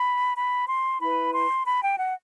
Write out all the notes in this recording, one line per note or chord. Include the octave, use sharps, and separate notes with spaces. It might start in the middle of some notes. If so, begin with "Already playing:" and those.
Already playing: B5
B5
C6
E4 B4 B5
C6
B5
G5
F#5